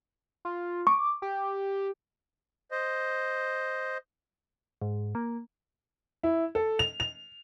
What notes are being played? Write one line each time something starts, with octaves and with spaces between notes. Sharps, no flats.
F4
C#6 D6
G4
C5 D#5
G#2
A#3
E4
A4
F7
F7